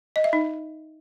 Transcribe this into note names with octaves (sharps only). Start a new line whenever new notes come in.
D#5
E5
D#4